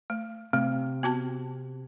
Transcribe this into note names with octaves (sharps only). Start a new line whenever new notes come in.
A3
C3 A3
B3 F#4 A5